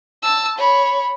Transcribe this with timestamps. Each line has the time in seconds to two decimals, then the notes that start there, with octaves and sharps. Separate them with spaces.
0.23 A5 E6
0.58 C#5 B5